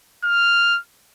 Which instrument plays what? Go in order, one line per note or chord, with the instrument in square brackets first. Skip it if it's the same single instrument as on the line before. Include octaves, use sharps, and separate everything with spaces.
[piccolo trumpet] F6